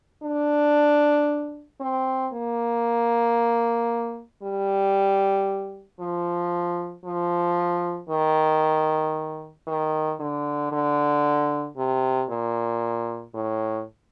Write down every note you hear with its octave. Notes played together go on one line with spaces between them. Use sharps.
D4
C4
A#3
G3
F3
F3
D#3
D#3
D3
D3
C3
A#2
A2